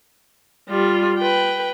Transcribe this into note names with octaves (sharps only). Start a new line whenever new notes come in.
G3 F4
B4 G5